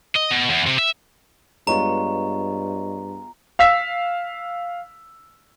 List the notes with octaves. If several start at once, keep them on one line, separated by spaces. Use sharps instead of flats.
D#5
B2
E2
C3
E5
G2 G#3 B3 F4 C#5 D#5 A#5 C#6
F5 E6 B6